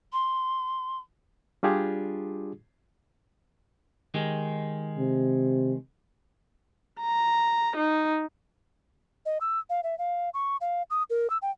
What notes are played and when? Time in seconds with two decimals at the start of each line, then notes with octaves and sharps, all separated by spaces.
0.13 C6
1.63 G3 D4 F4 G4 G#4
4.14 D#3 G#3 G4
4.98 C3
7.01 A#5
7.76 D#4
9.26 D#5
9.41 E6
9.70 F5
9.83 E5
9.99 F5
10.34 C#6
10.61 F5
10.90 D#6
11.10 A#4
11.30 E6
11.42 G5